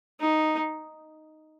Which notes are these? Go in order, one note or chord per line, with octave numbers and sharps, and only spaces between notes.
D#4